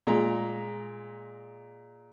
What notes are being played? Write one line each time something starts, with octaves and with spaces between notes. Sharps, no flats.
A#2 G#3 A#5